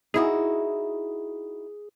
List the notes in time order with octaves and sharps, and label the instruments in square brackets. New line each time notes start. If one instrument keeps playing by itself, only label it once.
[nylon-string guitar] D#4 E4 F#4 [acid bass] G#4